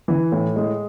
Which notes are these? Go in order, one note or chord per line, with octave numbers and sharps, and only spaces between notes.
E3
A2
G#3